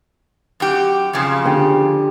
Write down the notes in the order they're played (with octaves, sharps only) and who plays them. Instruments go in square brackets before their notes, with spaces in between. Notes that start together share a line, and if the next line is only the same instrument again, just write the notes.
[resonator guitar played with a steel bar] F#2 F#4 G4
F2 C#3 F3
[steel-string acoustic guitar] D3 G4